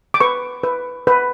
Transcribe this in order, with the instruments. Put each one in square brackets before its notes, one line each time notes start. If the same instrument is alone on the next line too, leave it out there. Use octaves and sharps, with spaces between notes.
[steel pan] D6
B4 C#6
B4
B4